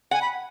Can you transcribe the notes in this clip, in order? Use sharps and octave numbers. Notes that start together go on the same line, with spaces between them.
F#5 G#5
B5